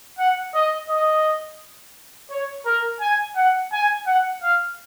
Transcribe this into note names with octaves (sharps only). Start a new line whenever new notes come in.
F#5
D#5
D#5
C#5
A#4
G#5
F#5
G#5
F#5
F5